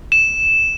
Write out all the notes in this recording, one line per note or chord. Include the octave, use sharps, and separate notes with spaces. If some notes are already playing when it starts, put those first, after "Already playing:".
E7